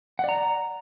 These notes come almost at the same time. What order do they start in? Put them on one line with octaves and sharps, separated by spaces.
F#5 D5 A#5